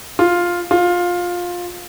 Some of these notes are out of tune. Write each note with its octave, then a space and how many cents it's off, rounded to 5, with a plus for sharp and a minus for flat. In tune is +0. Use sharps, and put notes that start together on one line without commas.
F4 +5
F4 +15